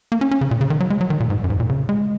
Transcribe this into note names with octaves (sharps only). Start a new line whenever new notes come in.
A#3
C#4
C#4
C#3
A#2
C#3
D#3
F#3
G#3
F#3
D#3
A#2
G#2
F#2
G#2
A#2
C#3
G#3